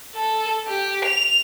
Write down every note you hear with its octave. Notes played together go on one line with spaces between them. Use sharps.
A4
G4
F7